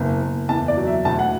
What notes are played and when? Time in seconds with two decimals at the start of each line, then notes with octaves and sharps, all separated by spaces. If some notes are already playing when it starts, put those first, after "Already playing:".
Already playing: F#1 B3
0.22 F#1
0.49 E2 A5
0.68 D5
0.78 F#3
0.87 E5
1.05 D2 A5
1.19 F#5